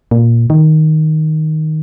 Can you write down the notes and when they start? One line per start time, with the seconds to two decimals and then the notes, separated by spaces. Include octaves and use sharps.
0.11 A#2
0.50 D#3